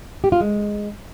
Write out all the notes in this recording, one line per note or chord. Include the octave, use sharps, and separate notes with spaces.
G4
F4
G#3